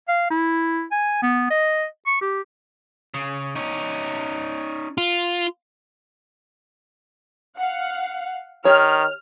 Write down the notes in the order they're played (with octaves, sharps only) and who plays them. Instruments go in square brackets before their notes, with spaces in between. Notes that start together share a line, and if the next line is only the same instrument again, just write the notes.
[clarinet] F5
E4
G#5
B3
D#5
C#6
G4
[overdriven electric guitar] C#3
C#4 D#4
[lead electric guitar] F4
[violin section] F5 F#5
[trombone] D#3 [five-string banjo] G4 C#5 [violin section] F6